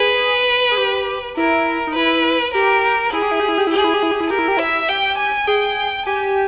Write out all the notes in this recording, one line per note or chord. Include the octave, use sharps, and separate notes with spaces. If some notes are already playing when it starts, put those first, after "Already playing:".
Already playing: G#4 B4
G#4
G4
E4 A#4
D#4
E4 B4
G4 A#4
E4 G#4
G4
E4
G4
E4
G4
E4
G4 G#4
E4
G4
E4
G4
E4
G4 A#4
E4
G4
E4 E5
G4 G5
G#5
G#4 G5
G4 G#5